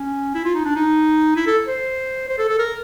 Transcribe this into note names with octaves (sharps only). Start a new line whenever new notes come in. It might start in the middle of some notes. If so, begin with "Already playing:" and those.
Already playing: C#4
E4
F4
D#4
D4
D#4
E4
A4
C5
C5
A4
A4
A#4